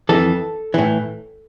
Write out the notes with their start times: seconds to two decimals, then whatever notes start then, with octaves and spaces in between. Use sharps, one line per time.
0.09 F2 E3 A4
0.74 A2 E3